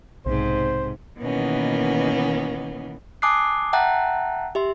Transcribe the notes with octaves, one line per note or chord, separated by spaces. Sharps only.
B1 G#2 C3 C5
B2 D#3 E3 A#3 B3 C#4
G#5 A5 D6 D#6 F#6 C7
E5 F#5 G5 A5 A#5 F#6
G4 E5 C6